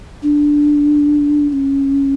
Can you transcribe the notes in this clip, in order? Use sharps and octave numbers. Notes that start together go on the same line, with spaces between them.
D4
D4
C#4